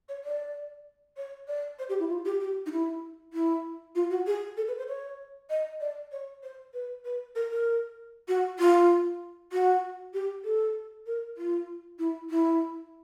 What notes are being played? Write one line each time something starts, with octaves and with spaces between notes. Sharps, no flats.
C#5
D5
C#5
D5
C5
G4
E4
F4
G4
G4
D#4
E4
E4
F4
F#4
G#4
A4
B4
C5
C#5
D#5
D5
C#5
C5
B4
B4
A#4
A#4
F#4
F4
F#4
G4
A4
A#4
F4
E4
E4